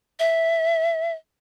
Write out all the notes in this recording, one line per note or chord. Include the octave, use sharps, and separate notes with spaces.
E5